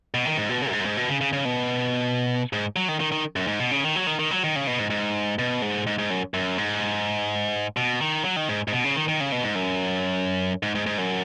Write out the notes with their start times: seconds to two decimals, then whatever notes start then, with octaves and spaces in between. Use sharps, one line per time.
0.14 B2
0.25 D#3
0.38 G#2
0.49 B2
0.62 C#3
0.70 F#2
0.73 G#2
0.80 F#2
0.85 G#2
0.97 B2
1.10 C#3
1.21 C#3
1.33 C#3
1.45 B2
2.53 G#2
2.76 F#3
2.88 D#3
3.00 D#3
3.12 D#3
3.36 F#2
3.47 G#2
3.60 B2
3.71 C#3
3.84 D#3
3.96 F#3
4.07 D#3
4.19 D#3
4.31 F#3
4.44 D#3
4.56 C#3
4.67 B2
4.79 G#2
4.90 G#2
5.39 B2
5.62 G#2
5.87 G#2
5.99 G#2
6.10 F#2
6.34 F#2
6.58 G#2
7.77 B2
8.01 D#3
8.24 F#3
8.36 D#3
8.49 G#2
8.68 G#2
8.72 B2
8.84 C#3
8.96 D#3
9.08 D#3
9.20 C#3
9.32 B2
9.44 G#2
9.55 F#2
10.63 G#2
10.75 G#2
10.86 G#2
10.98 F#2